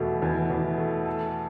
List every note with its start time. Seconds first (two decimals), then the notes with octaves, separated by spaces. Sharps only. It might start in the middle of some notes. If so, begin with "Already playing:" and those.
Already playing: E2 B2 A3
0.22 E2
0.50 E2
0.78 A3
1.06 A4